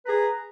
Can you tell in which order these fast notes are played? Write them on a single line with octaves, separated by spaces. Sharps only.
B4 A#5 G#4